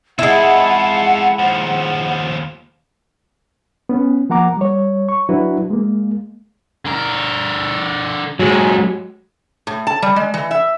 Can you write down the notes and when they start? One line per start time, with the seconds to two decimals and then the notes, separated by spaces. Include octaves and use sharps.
0.19 G#3 E4 F4 A4 F#5
1.39 D#2 F3
3.89 B3 C#4
4.30 F3 A#3 F#5 A#5 D6
4.57 G3 C#5
5.09 C#6
5.29 F#3 D4 E4 F#4 B4
5.70 G#3 A#3
6.85 D3 A#4
8.39 G#2 F#3 G#3
9.67 A2
9.87 A5
10.02 G3
10.16 G#3
10.34 E3
10.51 E5